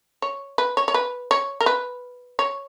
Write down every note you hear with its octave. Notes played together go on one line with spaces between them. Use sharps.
C#5
B4
C#5
C#5
B4
C#5
A#4
B4
C#5